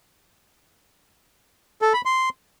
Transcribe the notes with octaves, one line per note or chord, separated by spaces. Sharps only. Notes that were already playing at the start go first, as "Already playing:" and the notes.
A4
B5
C6